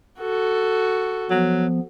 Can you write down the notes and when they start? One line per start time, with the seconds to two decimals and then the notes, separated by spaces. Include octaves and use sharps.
0.20 F#4 A4
1.30 F3 F#3 B3